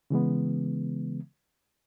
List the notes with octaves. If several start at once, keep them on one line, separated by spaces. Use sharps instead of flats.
C#3 E3 G#3 B3